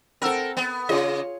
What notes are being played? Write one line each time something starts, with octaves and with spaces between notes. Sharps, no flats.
C4 A4 A#4 F#5 E6
B3
C#3 F4 G#4 C#5 D#5